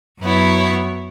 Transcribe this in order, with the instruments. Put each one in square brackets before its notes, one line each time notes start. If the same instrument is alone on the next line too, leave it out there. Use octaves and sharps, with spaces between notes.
[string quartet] F#2 F#3 B3 E4 C#5